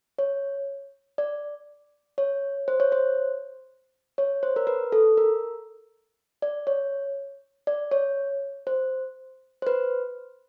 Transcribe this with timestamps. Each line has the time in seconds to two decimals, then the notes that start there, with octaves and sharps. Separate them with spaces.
0.19 C#5
1.18 D5
2.18 C#5
2.68 C5
2.80 C#5
2.92 C5
4.18 C#5
4.43 C5
4.56 A#4
4.67 B4
4.92 A4
5.17 A#4
6.42 D5
6.67 C#5
7.67 D5
7.91 C#5
8.67 C5
9.62 C5
9.67 B4